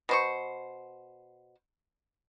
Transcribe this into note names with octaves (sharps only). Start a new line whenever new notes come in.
B2 C5 C#6